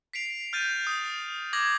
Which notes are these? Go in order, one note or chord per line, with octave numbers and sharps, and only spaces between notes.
B6 C7 D7 F7
F6 G6 A6 D#7
D#6
D6 G#6 A#6 F#7